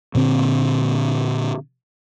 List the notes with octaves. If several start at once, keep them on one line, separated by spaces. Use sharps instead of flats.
A#2 D3 C4